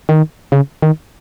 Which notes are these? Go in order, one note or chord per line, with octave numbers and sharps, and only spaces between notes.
D#3
C#3
D#3